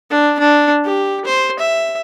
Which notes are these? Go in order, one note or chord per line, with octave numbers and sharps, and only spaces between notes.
D4
D4
G4
C5
E5